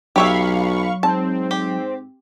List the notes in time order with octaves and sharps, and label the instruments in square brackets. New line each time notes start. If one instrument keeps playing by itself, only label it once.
[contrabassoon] B1 [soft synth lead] F#3 [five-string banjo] G4 C#5 E5 [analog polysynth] F5 B5 C#6
[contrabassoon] G#2 [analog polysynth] C4 [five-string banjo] A5
[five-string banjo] G4